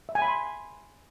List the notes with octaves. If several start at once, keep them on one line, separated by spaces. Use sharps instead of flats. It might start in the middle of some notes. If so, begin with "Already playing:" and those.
E5
G#5
B5
C6